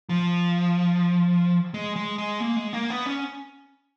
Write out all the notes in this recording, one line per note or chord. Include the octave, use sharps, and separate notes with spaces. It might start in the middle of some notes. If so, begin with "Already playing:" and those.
F3
G#3
G#3
G#3
A#3
G#3
A#3
B3
C#4